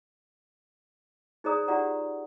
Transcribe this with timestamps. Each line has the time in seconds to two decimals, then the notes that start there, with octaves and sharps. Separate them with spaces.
1.44 D#4 G#4 C5 D5 A#5 D#6
1.68 D#4 F4 G4 D5 F#5 A#5